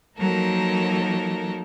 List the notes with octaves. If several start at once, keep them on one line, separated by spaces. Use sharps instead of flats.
F3 F#3 A#3 D#4 A4 A#4